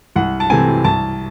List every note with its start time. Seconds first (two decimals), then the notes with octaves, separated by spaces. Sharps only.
0.16 C2 F#5
0.40 A5
0.50 C3 E3 A3 C4 G#5
0.84 C2 A5